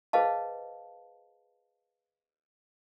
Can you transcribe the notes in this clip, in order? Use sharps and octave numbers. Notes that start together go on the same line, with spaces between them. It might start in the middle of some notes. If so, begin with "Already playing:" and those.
G#4 B4 C5 D#5 F5 A5